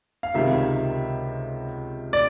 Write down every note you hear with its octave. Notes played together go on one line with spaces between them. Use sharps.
F5
C#2 C3 D#3 E5
D5